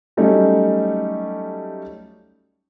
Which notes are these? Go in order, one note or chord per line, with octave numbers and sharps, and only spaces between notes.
F#3 G3 A3 C#4 D#4